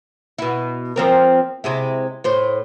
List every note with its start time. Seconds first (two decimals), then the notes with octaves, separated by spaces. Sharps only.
0.38 B2 E4
0.96 F3 C4 A#4
1.64 C3 G#3 E4
2.24 A2 C5